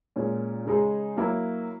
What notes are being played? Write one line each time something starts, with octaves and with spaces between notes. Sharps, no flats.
A#2 G#3 C#4
C#3 G#3 D#4 G#4
F#3 A#3 E4